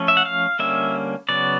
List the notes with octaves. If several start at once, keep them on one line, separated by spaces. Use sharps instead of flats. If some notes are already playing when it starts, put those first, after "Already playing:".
Already playing: F3 A3 C#4
E5
F#5
F5
D3 G3 A#3 C#4 E5
C#3 F#3 B3 D5